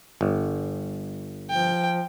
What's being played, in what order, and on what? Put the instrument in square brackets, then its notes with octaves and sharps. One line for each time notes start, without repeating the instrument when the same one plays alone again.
[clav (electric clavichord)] G1
[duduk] F3 [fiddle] G5